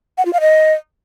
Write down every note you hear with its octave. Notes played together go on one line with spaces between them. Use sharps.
F#5
F4
F5
D#5